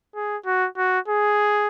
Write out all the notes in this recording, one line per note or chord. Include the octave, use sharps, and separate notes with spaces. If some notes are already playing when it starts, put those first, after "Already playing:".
G#4
F#4
F#4
G#4